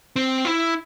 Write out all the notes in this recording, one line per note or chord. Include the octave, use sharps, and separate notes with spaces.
C4
E4